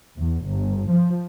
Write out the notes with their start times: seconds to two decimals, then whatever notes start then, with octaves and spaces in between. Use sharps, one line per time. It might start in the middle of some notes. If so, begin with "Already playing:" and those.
0.18 E2
0.46 G1
0.90 F3